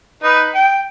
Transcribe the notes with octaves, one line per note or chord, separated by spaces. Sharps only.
D#4 B4
G5